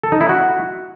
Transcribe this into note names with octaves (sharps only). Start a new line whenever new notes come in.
A4
D#4
E4
F#4